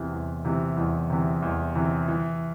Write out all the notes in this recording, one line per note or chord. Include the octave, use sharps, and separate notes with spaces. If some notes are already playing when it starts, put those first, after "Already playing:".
Already playing: E2 C3 E3
E2
C3 E3
E2
C3 E3
E2
C3 E3
E3